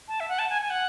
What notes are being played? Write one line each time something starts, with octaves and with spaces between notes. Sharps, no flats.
A5
E5
F#5
A5
G#5
G#5
F#5